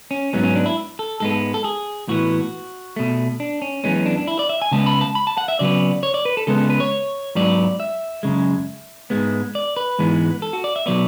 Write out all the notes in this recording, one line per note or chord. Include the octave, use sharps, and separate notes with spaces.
C#4
G#2 F#3 B3 C#4
C#4
D4
E4
A4
G#2 G#3 B3 A4
A4
G#4
A2 E3 B3 F#4
B2 A3
D4
C#4
F#2 E3 G#3 B3 C#4
C#4
D4
D4
E4
D5
E5
G#5
C#3 G#3 B3 A5
B5
A5
B5
A5
F#5
E5
C#3 F#3 B3 D5
C#5
D5
B4
A4
C#3 G#3 B3 A4
A4
B4
C#5
G#2 F#3 B3 D5
E5
F#2 C#3 G#3
G#2 G#3 B3
D5
B4
G#2 E3 G#3 B3
A4
F#4
D5
E5
B2 F#3 B3 D5